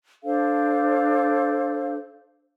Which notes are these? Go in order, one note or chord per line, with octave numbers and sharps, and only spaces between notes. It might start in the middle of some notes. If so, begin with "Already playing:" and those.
D4 A4 C5 F5